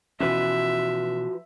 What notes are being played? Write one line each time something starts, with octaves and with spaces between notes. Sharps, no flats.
B2 E3 F3 C#4 F#4 B4 E5